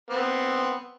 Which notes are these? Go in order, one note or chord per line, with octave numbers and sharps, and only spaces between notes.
B3 C4